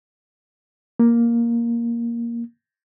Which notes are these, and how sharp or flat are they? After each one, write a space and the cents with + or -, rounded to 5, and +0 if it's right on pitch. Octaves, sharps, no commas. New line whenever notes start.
A#3 +5